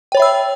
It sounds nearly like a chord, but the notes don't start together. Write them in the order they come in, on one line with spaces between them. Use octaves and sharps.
G5 C#5 B5 E5 E6